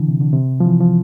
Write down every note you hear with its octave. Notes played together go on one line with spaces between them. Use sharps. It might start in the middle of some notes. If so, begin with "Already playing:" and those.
Already playing: D3 E3
C3
D3
C3
F3
E3
F3